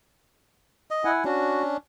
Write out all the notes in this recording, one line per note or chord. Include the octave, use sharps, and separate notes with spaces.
D#5
E4 F#5 G#5
C#4 D4 F#4